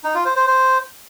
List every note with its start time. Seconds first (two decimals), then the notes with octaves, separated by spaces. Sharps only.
0.04 D#4
0.14 F4
0.25 C5
0.36 C5
0.47 C5